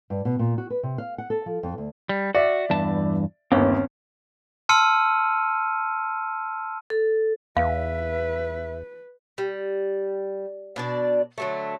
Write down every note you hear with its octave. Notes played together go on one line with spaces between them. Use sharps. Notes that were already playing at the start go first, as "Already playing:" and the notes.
G2
B2
A#2
F#4
B4
C3
F5
F#5
A4
F3
F2
D2
G3
F#4 D5 E5
E2 G2 A5
G1 D#2 C4 C#4
A5 C6 E6 F6 C#7 D#7
A4
E2 B4 E5 F5
G3
B2 D4 D5
D3 F#3 A3